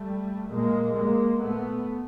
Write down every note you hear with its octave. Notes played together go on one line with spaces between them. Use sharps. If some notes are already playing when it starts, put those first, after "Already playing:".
Already playing: G3 A3
A#2 G#3 A#3
G#3 A#3
A#2 A3 B3